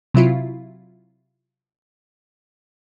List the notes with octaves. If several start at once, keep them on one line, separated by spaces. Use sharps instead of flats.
C3 F#3 E4 F4